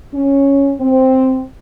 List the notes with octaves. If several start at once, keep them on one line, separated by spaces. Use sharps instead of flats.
C#4
C4